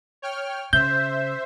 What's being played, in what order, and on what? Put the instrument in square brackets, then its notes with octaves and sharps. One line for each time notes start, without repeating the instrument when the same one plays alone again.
[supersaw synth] C#5 G5 F6
[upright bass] C#3 [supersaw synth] C5 E5 [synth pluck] G6